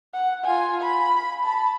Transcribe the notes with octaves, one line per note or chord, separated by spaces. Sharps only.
F#5
F4 G#5
B5
A5 B5